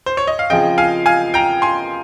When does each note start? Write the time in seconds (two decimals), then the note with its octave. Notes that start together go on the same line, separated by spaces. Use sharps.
0.06 C5
0.17 C#5
0.27 D#5
0.39 F5
0.50 C#3 F3 C4 F4 G#4 D#5 G5
0.78 F5 G#5
1.06 F5 G#5
1.34 G5 A#5
1.62 G#5 C6